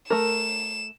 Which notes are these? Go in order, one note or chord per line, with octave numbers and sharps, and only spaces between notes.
A3 A#4 E7